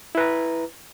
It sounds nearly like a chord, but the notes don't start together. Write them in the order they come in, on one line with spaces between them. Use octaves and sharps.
E4 B4 A#5